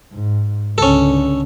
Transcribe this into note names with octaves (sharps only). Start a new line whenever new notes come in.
G#2
C#2 D3 C#4 A4